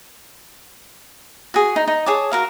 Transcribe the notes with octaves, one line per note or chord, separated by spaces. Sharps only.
F#4 G#4
D#4
D#4
G#4 C#5 A5 D6
F#4 A#4 F5